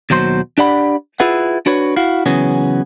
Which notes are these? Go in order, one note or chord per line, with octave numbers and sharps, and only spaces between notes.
D#2 B2 F#3 C5 C6
D4 G4 D5 F#5 B5
E4 F4 G#4 B4 F#5
D4 F#4 B4 C#5
E4 F#4 F5
C#3 E3 F#3 B3 C#4 G#4